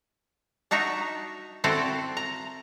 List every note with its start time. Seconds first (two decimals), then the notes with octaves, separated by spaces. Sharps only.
0.71 D4 D#4 F#4 E5 A#5
1.64 C4 E4 F#4 A4 C5 D5
2.17 A#5